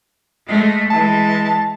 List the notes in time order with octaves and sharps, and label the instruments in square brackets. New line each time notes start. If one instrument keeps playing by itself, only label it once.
[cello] G#3 A3
[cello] E3 G#3 [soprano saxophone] A5